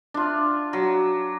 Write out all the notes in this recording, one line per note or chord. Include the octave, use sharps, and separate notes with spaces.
D4 F4
F#3